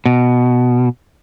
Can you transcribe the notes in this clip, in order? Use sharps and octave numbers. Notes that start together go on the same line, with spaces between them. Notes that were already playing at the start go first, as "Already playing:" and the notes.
B2